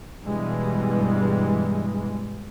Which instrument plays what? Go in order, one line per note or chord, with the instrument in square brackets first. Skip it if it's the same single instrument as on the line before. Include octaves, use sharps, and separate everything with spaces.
[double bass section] G2 B2 E3 G3 G#3